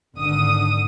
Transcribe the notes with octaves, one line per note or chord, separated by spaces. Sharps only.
G#1 D3 D#6